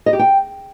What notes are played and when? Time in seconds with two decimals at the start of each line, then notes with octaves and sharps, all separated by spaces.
0.06 D#5
0.13 G4
0.19 G5